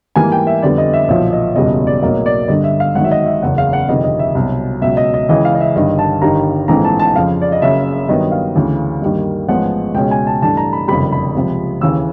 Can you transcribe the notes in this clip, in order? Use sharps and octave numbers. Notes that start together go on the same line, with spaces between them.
G#2 E3 G3 A#3 G#5
G5
E5
F2 D3 G3 B3 D5
D#5
E5
B1 A#2 F3 E5
D#5
F#1 E2 B2 G3 D#5
D5
B1 A2 F#3 A#3 D#5
D5
G1 G2 D3 G3 D#5
E5
F5
G#1 G#2 D#3 F#3 F#5
E5
D#5
E5
F#1 E2 C#3 F#5
F5
F#5
G1 F2 C3 D#3 D#5
D#5
E5
C2 B2 F#3
C#2 B2 F#3 E5
D#5
D#5
C#2 C#3 E3 D#5
F5
D#5
E5
G1 G2 D#3 D#5
A5
G1 G2 D#3 G3 A#5
A#1 G#2 E3 A3 C4 A#5
A5
A5
F2 C#3 F3 F5
D5
D#5
F#1 F#2 C#3 E5
G2 D#3 F#3 B3 D#5
F5
D2 C#3 E3
G2 D#3 G3 A#3
A1 G#2 F3 G#3 B3 F#5
C#2 B2 G#3 C#4 G5
G#5
A5
G2 E3 A3 D4 A5
A#5
B5
F#1 F2 C3 D#3 G3 B5
B5
C#2 C3 F3
D#2 C#3 E3 E6